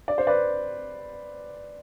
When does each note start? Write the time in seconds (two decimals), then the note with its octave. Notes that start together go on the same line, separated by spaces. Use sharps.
0.08 D5
0.18 C5
0.27 B4 D5